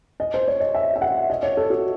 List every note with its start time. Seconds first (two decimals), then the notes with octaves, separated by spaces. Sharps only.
0.20 D#5
0.34 C5
0.48 C#5
0.60 D#5
0.74 E5
0.96 E5
1.01 F#5
1.30 D#5
1.43 C#5
1.57 A4
1.70 F#4